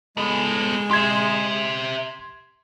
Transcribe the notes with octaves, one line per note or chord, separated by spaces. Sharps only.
G#3 B3 A4
G4 E5 C6 G#6